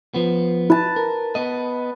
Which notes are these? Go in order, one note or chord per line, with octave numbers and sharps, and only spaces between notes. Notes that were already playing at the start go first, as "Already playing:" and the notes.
F3 B3
E4 B4 A5
A#4
B3 D#5